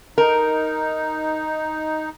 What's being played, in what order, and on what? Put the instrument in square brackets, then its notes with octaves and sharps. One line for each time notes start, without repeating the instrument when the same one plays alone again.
[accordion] D#4 [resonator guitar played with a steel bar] A#4